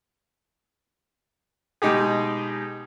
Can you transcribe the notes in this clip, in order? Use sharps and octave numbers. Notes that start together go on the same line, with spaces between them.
B2 G#3 D#4 G4 G#4